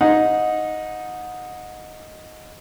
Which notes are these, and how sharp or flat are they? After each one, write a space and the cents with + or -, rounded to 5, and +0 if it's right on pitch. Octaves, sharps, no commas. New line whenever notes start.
D#4 +0 F#5 -25